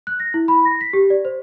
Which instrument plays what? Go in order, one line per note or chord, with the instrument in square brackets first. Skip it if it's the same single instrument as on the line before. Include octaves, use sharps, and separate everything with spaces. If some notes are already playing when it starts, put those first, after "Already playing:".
[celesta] F#6
A#6
E4
B5
A#6
B6
G4
D5
C5